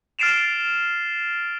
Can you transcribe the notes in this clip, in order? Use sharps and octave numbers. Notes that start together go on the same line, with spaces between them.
F6 A6 C7 D7 E7 F7